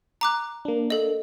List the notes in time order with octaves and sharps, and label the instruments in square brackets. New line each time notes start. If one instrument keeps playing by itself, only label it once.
[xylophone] A#5 D6 F#6
[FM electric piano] A#3 D4
[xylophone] A4 D#5